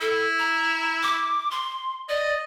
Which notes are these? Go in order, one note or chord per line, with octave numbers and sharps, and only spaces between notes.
E4 A4
A#5
D6
C6
D5 D#5